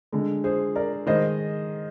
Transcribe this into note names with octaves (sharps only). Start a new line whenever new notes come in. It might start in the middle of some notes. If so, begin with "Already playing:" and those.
D3 G#3
G#4 C5
A#4 D5
D#3 G#3 C5 D#5